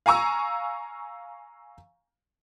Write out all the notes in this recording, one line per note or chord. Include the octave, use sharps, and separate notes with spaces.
F5 G#5 A#5 C#6 E6